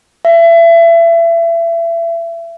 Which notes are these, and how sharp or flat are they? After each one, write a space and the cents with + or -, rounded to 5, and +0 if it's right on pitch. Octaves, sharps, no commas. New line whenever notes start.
E5 +30